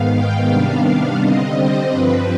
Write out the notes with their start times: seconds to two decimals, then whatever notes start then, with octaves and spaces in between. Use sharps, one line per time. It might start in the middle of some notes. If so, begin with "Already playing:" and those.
Already playing: G#2 D#3 B3 F5
0.14 G5
0.50 C3 D#3 G3 B3 D4 F5
1.21 D3 G3 C4 D#5
1.57 C5
1.92 G2 F3 C4 B4